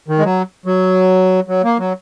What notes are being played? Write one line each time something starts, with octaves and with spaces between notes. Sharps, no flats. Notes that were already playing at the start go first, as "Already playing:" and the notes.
D#3
G#3
F#3
F#3
F#3
A#3
F#3